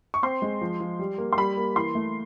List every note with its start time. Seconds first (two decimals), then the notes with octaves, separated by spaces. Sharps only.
0.14 C#6
0.23 C4 C6
0.42 G#3
0.61 F3
0.80 F3
0.99 G3
1.18 A#3
1.33 C6
1.37 G3 B5
1.57 A#3
1.76 E3 C6
1.95 A3